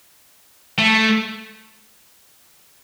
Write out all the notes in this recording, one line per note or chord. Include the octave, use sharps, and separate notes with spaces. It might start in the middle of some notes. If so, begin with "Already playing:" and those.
A3